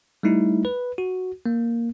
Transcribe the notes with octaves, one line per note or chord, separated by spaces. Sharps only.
G3 A3 D#4 E4
B4
F#4
A#3